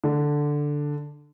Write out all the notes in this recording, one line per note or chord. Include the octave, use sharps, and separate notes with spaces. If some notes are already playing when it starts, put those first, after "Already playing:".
D3